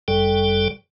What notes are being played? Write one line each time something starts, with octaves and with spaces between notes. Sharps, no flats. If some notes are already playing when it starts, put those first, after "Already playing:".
G1 F#2 G3 A4 G5